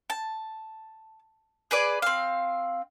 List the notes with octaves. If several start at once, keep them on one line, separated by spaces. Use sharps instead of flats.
A5
G#4 B4 D5
C4 F5